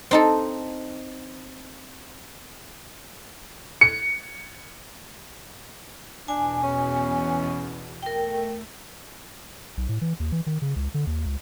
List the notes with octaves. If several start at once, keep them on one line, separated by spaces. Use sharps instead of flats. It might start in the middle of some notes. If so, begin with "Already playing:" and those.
C4 D#4 A4
C#7
E2 B2 D4 G#5
C#4
A3 A#4 G5
B1
A2
E3
D#2
E3
D#3
C#3
C#2
D3
D#2
C#2